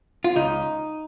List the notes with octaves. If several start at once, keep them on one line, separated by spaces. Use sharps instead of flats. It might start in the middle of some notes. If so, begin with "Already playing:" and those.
F4
C#2 D#4